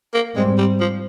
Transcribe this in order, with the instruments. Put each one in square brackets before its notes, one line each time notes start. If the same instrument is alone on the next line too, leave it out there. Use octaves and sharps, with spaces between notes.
[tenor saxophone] A#3
[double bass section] G#2 G3 C4 [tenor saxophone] G#3
[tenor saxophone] G3
F3